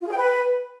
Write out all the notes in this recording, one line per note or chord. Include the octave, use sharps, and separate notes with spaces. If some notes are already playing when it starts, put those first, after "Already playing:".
F4
G#4
G5
B4